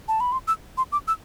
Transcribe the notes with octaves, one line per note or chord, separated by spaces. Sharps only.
A5
B5
C6
E6
C6
D6
E6